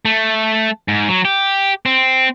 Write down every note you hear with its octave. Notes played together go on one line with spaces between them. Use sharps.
A3
G#2
F#3
G4
C4